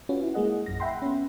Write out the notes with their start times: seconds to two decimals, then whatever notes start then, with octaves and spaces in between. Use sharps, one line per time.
0.09 C#4 F4 F#4 B4
0.23 E4
0.34 G#3 A#3 G#4 D#5 F#5
0.66 A#1 F#2 A#6
0.80 E5 F#5 G5 B5 C6
1.02 B3 C#4